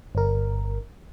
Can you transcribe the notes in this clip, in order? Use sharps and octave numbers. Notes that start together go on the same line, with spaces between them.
G1 A#4